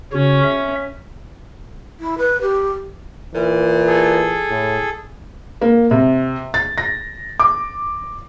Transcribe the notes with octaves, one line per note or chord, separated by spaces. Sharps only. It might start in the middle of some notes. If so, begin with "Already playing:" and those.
C#3 C#4 F#4
E5
E4
B4
G4
A#2 E3
G#4 A4
A2
A#3
C3
A6
A#6
D6